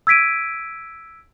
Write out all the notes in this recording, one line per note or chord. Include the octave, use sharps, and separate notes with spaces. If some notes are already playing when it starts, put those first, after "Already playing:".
E6 G#6 B6 D7 D#7